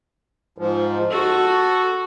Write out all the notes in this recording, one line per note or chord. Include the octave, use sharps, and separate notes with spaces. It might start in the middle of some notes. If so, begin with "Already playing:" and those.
G#2 F3
F#4 A4